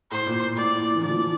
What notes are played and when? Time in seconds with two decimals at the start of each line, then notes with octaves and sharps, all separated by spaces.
0.11 A2 C5
0.26 A#2
0.56 A2 D5
0.79 A#2
0.95 E3
1.01 D3 D5
1.09 F3
1.16 E3